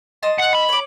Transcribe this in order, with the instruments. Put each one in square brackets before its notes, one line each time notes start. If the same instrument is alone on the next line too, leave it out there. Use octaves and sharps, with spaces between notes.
[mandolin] D#5 A5 C6
[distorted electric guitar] F#5
B5
[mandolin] C#5 D6